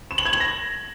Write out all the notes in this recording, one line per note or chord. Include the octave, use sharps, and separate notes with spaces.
E7
F#7
G#6
F#7
A#6